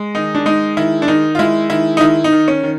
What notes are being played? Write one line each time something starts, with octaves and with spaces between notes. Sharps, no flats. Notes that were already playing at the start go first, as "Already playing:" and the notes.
Already playing: G#3
D#3 D#4
D4
G#3 D#4
D#3 E4
D4
D#3 D#4
F4
G#3 E4
D#3 E4
D#4
D#3 E4
D#4
D#3
C#4
D#3